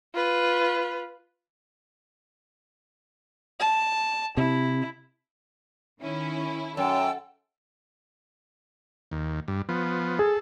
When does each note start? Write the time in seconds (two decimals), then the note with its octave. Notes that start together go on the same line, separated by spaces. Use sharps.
0.15 F4 B4
3.60 A5
4.37 C3 E4
6.02 D#3 C#4 E4
6.77 F#2 A4 G5 G#5 E6
9.12 D#2
9.48 G2
9.69 F3 B3
10.19 G#4 A4